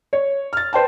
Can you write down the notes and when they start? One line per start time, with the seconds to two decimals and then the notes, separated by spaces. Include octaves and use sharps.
0.13 C#5
0.53 F6 A6
0.73 B4 C5 G5 A5